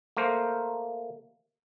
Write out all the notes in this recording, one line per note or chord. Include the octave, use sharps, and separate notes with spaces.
A3 A#3 A#4 C5